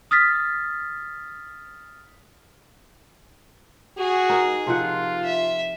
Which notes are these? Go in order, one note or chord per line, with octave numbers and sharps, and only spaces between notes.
D#6 F6 A6 B6
F#4 G#4
D#4 A#4
C3 F3 F4 F#5
E5